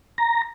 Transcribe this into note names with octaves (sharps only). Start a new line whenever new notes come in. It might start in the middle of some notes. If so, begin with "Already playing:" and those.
A#5